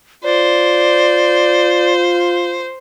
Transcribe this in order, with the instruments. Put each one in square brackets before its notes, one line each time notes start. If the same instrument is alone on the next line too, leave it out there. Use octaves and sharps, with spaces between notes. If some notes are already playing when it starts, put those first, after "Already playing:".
[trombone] F4 [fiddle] C5 [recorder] D5